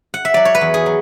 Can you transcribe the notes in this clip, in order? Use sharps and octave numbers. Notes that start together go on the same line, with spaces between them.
F#5
E5
F#3 D5
C#5
B4
E2
G#4
F#3